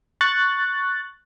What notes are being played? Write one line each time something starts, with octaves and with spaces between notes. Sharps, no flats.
C#6 F#6 A6